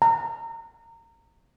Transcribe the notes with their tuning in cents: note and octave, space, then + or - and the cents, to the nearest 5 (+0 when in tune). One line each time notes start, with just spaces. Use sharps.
A#5 -25